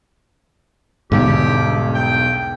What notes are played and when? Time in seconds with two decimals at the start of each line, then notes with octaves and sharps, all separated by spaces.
1.12 E1 B1 G#2 D3 G3 G4
1.95 G5